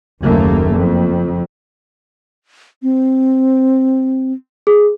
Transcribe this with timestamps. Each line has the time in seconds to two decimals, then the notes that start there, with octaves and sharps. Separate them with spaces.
0.22 F#1 D#2 A3 A#3
0.74 F2
2.83 C4
4.67 G#4